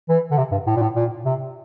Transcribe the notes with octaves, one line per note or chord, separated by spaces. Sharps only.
E3
D3
C3
G2
A2
A#2
A2
A#2
C3